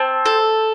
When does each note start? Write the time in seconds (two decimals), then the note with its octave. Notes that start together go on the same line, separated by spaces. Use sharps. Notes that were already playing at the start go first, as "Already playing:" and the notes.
Already playing: C4 A5
0.26 A4